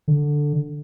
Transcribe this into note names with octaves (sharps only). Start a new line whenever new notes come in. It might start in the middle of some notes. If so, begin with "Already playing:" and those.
D3